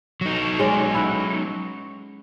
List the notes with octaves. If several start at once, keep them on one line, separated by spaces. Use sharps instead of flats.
F#3 D#4
G#3 C#4 D5
E4 F#5